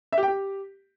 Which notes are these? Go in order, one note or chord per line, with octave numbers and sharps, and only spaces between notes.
E5
G4
G5
G4